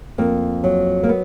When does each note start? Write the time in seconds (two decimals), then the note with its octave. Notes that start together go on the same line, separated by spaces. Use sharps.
0.18 F2 A#3
0.64 F#3
1.03 A#3
1.09 B3